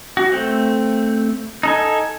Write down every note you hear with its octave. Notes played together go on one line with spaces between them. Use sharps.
F#4
A3 C4
D#4 A4 G#5